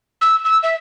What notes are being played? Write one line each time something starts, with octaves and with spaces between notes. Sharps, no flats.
E6
E6
E5